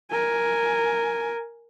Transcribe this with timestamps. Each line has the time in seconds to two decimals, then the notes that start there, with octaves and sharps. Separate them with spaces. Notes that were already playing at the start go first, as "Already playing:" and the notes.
0.11 A#4 G#5